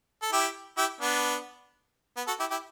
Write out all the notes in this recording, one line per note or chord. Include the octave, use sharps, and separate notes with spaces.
A4
E4 G4
E4 G4
B3 D4
B3
F#4 A4
E4 G4
E4 G4